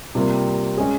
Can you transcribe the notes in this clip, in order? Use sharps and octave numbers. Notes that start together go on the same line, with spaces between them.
C3 G3 A#3 F4
G#3 C#4 G#4